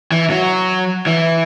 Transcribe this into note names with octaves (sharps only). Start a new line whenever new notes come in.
E3
F#3
E3